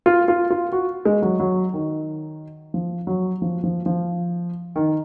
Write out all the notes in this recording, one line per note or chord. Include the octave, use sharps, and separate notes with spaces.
F4
F4
F4
F#4
G#3
F#3
F#3
D#3
F3
F#3
F3
F3
F3
D#3